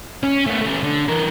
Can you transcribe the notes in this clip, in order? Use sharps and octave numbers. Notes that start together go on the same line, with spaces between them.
C#4
A3 B3
A3 C#4
D3
E3 A#4